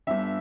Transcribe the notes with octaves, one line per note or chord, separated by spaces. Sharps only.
G1 G2 D3 E5